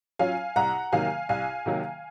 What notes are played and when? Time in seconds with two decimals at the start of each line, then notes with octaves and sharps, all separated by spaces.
0.19 F#3 C#4 F4 F5 G#5
0.56 C2 F#5 A#5
0.92 C3 D#3 F#3 A#3 F5 G#5
1.29 C2 F5 G#5
1.66 C3 D#3 F#3 A#3